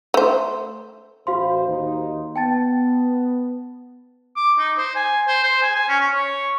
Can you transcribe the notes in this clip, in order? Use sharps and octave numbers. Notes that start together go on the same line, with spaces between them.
A3 C5
A1 F#4 C5 F5 C6
D#2 D#4
B3 G5 A5 A6
D6
D#4
C5
G#5
C5
C5
G#5
G#5
C#4
C#4
C#5